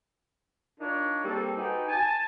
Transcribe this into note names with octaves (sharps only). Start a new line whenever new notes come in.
D4 D#4 F4 A#4 C#5 D5
G3 A#3 C4 G#4 A4
D#4 F#4 G4 B4 G5 G#5
G#5 A5